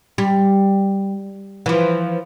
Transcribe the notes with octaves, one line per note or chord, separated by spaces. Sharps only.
G3
E3 F3